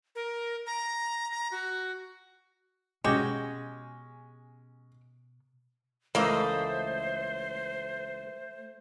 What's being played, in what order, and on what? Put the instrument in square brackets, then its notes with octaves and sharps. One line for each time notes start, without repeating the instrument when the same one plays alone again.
[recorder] A#4
A#5
A#5
F#4
[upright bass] B2 [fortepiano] G#3 C#4 [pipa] F#4 G4 G5
[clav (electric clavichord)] C#2 E3 E5 [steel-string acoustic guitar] A3 [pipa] A#3 A#4 D#5 [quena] C5